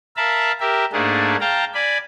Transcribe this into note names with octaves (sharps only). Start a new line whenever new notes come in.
A#4 E5 F5 A5 B5
G4 A#4 E5
G#2 A3 A#3 D4 G#4
F5 G5 A5 A#5
D5 G#5 B5